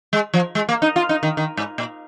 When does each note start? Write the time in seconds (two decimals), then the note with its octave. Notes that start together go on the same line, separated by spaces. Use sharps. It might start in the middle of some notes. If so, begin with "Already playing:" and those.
0.13 G#3
0.34 F3
0.55 G#3
0.69 A#3
0.82 D#4
0.96 F4
1.09 D#4
1.23 D#3
1.37 D#3
1.57 G#2
1.78 A#2